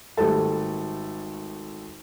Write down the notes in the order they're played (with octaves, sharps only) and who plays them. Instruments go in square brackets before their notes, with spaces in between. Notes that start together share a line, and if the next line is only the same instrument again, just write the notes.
[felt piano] G#1 G3 A3 A4